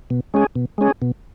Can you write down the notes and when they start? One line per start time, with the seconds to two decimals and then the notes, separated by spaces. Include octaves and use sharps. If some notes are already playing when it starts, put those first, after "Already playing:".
0.10 B2
0.34 G#3 C#4 G#4
0.55 B2
0.78 G#3 C#4 G#4
1.02 B2